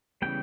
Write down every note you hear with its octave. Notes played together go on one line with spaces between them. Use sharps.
C#3 E3 G3 B3 G5